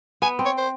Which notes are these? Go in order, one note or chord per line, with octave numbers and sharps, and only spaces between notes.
B3 G#5
C4
C#5
C5